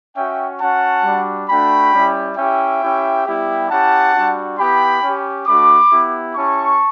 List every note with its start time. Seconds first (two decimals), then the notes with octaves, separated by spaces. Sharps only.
0.16 C#4 F#4 E5 G5
0.60 C#4 F#4 F#5 A5
1.05 G3 D4 F#4
1.49 A3 D4 F#4 G5 B5
1.93 G3 C#4 E4 G4
2.37 C#4 E4 G4 E5 G5
2.81 C#4 E4 G4
3.26 G3 B3 E4 G4
3.70 C#4 E4 G4 F#5 A5
4.14 G3 D4 F#4
4.58 B3 E4 G4 G5 B5
5.03 C#4 G4
5.47 A3 D4 F#4 B5 D6
5.91 B3 E4 G4
6.35 C#4 E4 G4 A5 C#6